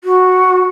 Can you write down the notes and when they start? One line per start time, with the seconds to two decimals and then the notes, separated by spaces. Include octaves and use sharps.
0.04 F#4